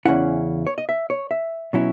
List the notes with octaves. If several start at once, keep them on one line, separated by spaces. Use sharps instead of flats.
E2 C#3 F#3 C#4 E4 F#5
C#5
D#5
E5
C#5
E5
B2 F#3 C#4 E4